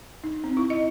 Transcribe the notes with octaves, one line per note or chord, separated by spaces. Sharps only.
D#4
C4
E4
D#5